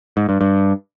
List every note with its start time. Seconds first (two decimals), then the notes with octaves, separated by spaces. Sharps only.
0.17 G#2
0.29 G2
0.41 G2